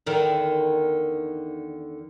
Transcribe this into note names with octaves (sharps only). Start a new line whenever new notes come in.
E2 D3 D#3